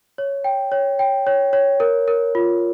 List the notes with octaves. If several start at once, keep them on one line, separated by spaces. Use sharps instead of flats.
C#5
G5
C#5
G5
C#5
C#5
A#4
A#4
F4